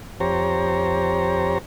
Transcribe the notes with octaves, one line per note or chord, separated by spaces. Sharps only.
F2 G4 C5 C#5 A#5